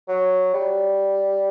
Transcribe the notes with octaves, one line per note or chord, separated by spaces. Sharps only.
F#3
G3